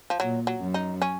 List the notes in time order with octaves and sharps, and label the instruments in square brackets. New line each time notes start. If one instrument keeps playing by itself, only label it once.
[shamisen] F3
[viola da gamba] A#2 [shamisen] F#3
[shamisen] F#3
[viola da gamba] F#2
[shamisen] D#4
C#4